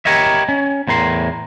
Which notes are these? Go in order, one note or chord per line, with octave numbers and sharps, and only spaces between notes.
E4 G4 A#4 C#5 D#5 E5
C#4
E2 A2 A#4 C6